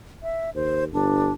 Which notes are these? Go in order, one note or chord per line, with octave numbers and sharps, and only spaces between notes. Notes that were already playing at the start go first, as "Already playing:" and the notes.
E5
D#2 C5
G1 D4